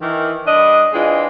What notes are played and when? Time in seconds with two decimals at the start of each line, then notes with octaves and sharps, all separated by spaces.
0.01 D#3 E3
0.46 G2 D4 B4 D#5
0.93 E3 G#3 C4 D4 F4